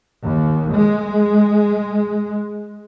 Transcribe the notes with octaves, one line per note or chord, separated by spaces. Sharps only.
D#2
G#3